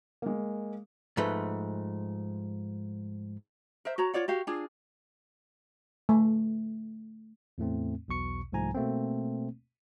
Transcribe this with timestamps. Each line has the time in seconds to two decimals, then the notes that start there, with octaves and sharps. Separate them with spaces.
0.22 G#3 A#3
1.17 G#2 F3 A3 B4
3.85 A#4 C5 E5
3.98 F#4 C#5 A#5
4.14 F4 C#5 D5 F#5
4.28 F#4 G4 F5
4.47 D4 F4 G#4
6.09 A3
7.58 E2 A2 A3 C4
8.08 B1 E2 B2 C#6 C#7
8.52 C2 G#2 F3 A3 G#5 A#5
8.75 B2 A3 A#3 C4